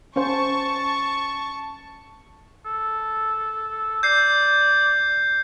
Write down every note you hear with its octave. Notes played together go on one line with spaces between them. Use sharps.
C#4 C5 A5 C#6
A4
D5 G6 C7